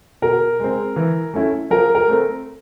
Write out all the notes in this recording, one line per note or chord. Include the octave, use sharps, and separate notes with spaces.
B2 A#4
G#3 C4
E3
A3 C#4 E4
F3 A#4
A#4
A3 C4